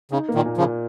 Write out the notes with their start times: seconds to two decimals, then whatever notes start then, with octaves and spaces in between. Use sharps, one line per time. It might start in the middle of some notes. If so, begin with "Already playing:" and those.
0.11 C#3 D#4
0.29 A#3
0.34 A#2 D#3
0.46 A#2
0.57 C#3 F3
0.62 A#2